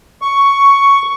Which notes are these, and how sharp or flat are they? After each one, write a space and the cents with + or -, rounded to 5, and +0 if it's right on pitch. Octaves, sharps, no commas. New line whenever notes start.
C#6 +5